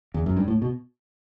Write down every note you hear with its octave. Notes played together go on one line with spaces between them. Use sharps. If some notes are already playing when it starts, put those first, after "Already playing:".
E2
F#2
G2
A2
B2